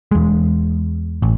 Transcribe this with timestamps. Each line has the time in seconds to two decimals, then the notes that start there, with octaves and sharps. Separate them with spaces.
0.11 E2 G#3
1.22 A1